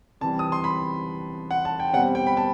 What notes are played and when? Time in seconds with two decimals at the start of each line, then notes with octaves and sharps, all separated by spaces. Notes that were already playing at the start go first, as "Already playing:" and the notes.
0.21 C3 E3 G3 A5
0.39 D#6
0.52 C6
0.64 B5
1.51 F#5
1.65 A5
1.80 G5
1.93 B2 G3 C4 F#5
2.15 G5
2.27 B5
2.37 A5